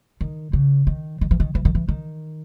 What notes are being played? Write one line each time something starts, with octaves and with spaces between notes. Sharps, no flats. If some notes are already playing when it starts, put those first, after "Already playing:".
D#3
C#3
D#3
D#3
E3
D#3
E3
D#3
E3
D#3